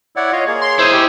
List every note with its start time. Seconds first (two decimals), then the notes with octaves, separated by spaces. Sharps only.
0.16 E4 C#5 D5 F#5
0.32 F4 C#5 D#5 F5
0.47 A#3 G#4 C#5
0.62 C6
0.79 E4 C5 D#5 G#5
0.93 G4